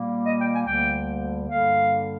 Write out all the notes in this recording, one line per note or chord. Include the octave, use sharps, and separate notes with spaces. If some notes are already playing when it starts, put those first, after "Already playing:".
Already playing: A#2 G3 A#3
D#5
G5
G#5
D2 D3 G3 A#3 G5
G2 D3 G3 A#3 F5